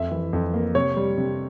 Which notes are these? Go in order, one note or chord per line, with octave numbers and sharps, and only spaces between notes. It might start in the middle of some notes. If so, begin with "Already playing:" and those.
Already playing: F2 E5
E3
F2
A#3
C3 C#5
G3
C3